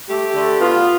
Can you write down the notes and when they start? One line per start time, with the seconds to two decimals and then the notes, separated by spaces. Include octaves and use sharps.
0.09 A3 G4
0.35 D3
0.60 B3 F4